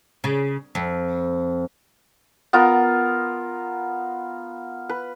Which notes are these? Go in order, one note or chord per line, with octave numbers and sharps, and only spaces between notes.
C#3
F2
B3 F4 A#4
B4